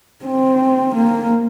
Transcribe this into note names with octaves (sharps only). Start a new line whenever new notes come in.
C4
A#3